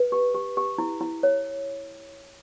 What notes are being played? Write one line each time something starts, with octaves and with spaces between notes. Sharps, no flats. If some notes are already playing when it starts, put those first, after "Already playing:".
Already playing: B4
G4
G4
G4
E4
E4
C#5